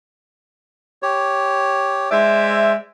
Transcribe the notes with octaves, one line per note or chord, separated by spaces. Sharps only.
G4 C#5
G#3 C5 D5 E5